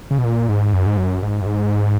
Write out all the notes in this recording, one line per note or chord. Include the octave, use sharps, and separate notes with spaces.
C#3
B2
A#2
G#2
F#2
G#2
F#2
G#2
F#2
G#2